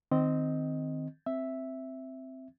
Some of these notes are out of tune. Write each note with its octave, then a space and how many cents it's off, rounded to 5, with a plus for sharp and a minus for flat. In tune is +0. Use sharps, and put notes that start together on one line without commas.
D#3 -5 C4 -10 D#5 +0
C4 +0 E5 +0